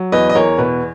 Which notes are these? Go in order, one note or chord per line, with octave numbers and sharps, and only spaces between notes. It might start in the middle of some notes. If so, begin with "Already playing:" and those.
Already playing: F#3
E2 B4 D#5
D#5
E2 A#4 C#5
B2 B4